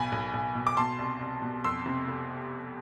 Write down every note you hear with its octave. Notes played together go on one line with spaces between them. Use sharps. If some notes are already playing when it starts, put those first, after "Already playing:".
Already playing: B1 B2 G#5 B5
B1
B1
B2
D6
B2 A5 C6
C2
C2
B2
F2 C6 E6
C3
F1